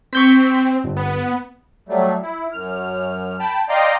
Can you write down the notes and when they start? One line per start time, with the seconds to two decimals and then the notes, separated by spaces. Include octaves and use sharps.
0.13 C4 C#6 G6 B6
0.84 G1
0.97 B3
1.89 F#3 G3 A3
2.22 E4
2.52 F#2 F6
3.40 G5 A5 B5
3.69 D5 D#5 F5 G5 A#5 C6